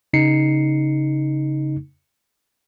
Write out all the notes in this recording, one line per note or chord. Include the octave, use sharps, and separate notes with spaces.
C#3 D#4 C7 C#7